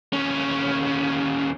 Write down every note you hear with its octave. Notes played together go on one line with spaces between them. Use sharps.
D#2 C#4